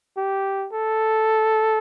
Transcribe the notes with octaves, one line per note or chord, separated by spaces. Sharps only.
G4
A4